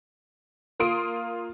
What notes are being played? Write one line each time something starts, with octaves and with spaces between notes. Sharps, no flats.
A#3 F4 C6 D#6 D7